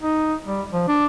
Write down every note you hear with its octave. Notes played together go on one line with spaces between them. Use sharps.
D#4
G3
F3
D4